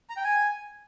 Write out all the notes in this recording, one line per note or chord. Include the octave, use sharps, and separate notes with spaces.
A#5
G5
G#5